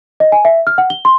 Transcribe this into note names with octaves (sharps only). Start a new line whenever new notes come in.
D#5
G#5
E5
F6
F#5
G7
C6